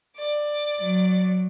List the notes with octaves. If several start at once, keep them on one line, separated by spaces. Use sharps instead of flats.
D5
F#3